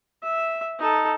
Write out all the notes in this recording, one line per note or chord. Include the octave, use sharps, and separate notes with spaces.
E5
D#4 A4